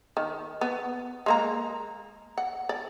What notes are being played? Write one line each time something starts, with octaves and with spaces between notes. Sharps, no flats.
D#3
B3
G#3 A#3 A#5
F#5
D5